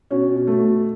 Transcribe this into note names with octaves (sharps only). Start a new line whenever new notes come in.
B2 C#4
B2
A3
B2